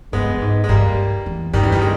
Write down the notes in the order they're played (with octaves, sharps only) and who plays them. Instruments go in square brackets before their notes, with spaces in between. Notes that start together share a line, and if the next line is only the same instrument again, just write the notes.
[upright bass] G2 [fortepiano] G#3 B3
[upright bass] G2
G#2
[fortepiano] G#3
[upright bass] G2 [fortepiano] G3 A#3
[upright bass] E2
[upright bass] G2 [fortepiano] D#3 G3
[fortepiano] E3
D#3 G3
G#3